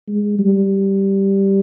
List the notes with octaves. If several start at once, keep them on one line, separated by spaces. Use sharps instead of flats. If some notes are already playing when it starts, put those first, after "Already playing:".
G#3
G3